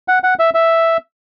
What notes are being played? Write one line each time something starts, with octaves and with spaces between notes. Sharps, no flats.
F#5
F#5
E5
E5